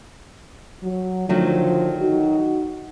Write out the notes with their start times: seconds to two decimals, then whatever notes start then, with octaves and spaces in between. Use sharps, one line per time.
0.83 F#3
1.29 D3 D#3 F3 F#3 A3
2.00 D#4 F#4